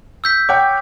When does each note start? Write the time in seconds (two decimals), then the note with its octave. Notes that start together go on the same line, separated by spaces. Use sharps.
0.24 E6 G6 B6
0.49 C#5 F#5 G5 D6